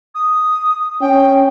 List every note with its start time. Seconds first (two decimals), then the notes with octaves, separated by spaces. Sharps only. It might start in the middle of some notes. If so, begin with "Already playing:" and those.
0.15 D#6
1.01 C#4 G5